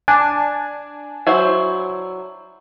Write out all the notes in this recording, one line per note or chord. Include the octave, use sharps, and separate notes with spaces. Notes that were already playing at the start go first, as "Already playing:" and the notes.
D4 G#5
F#3 E4 C5